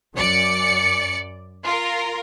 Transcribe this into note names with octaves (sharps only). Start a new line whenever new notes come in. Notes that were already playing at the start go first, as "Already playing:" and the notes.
F#2 D5 C#7
F4 A#4